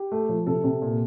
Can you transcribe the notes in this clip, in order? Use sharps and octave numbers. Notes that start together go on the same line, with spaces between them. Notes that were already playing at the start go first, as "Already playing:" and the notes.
Already playing: G4
A3
F3
C3 A4
C3
A#2